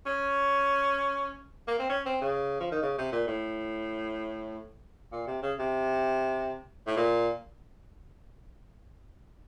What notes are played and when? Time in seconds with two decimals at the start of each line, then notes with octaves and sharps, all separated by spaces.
0.06 C#4
1.68 A#3
1.79 C4
1.90 C#4
2.06 C4
2.21 C#3
2.60 F3
2.72 D#3
2.83 C#3
2.98 C3
3.12 A#2
3.28 A2
5.13 A#2
5.27 C3
5.43 C#3
5.59 C3
6.87 A2
6.97 A#2